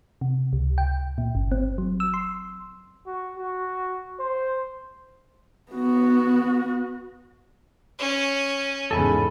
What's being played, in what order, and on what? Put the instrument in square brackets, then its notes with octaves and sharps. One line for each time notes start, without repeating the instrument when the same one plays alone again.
[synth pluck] C3
C#2
G5
A#2
G1
C4
F#3
E6
C6
[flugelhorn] F#4
F#4
C5
[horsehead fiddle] B3 F#4
[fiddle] C#4
[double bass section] E2 G#2 C#3 [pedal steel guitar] A4 G#5 B5